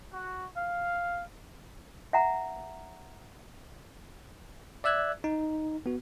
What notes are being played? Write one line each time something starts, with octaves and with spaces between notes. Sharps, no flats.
F#4
F5
E5 F#5 A#5
D5 E5 E6 F#6 G#6
D#4
B3 F#4